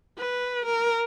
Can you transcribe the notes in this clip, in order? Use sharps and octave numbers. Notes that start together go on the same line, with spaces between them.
B4
A#4